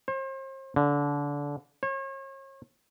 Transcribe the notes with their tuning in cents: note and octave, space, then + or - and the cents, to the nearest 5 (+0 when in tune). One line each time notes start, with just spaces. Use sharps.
C5 +40
D3 -25
C#5 -40